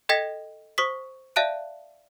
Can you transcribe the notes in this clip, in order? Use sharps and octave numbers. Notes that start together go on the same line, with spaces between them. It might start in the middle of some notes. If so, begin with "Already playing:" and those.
A4 D#5 G5 G#6 A#6 B6
C5 C#6 D#6 B6
D5 E5 F5 A5 F#6 D7